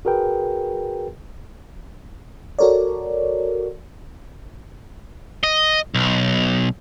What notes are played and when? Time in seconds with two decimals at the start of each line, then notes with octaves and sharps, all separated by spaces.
0.05 F#4 G#4 A#4 B4 G5
2.59 F#4 A4 A#4 C#5 D5
5.43 D#5
5.95 B1